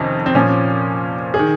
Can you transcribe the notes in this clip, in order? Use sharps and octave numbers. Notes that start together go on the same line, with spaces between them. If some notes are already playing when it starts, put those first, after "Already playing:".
Already playing: F2 C3 D#3 C#4 D#4
C4
A#2 F3 C#4
G#4
D#3